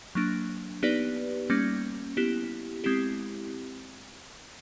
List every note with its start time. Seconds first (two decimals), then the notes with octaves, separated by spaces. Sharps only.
0.15 F#3 A#3 D4
0.83 B3 D#4 G4 B4 D5
1.50 G3 A#3 C#4
2.17 B3 E4 G4
2.84 G#3 C4 E4 G4